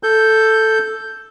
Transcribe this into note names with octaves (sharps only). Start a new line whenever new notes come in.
A4 G6